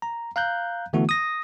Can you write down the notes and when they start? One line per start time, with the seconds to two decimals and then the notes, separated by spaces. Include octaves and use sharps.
0.02 A#5
0.36 F5 A#5 F#6 G6
0.93 D3 E3 A3 B3 E4 F#4
1.09 D#6 A#6